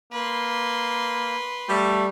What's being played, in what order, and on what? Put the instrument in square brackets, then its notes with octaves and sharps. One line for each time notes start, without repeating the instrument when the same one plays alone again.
[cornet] A#3 [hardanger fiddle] B4 C6
[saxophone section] G3 [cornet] A3